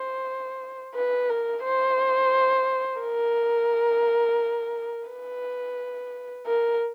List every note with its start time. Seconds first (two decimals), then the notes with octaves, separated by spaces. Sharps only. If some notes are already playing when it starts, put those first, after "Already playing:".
Already playing: C5
0.96 B4
1.30 A#4
1.64 C5
3.02 A#4
5.09 B4
6.47 A#4